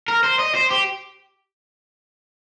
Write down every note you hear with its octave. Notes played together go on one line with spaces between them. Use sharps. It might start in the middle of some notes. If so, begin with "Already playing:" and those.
A#4
C5
D#5
C5
G4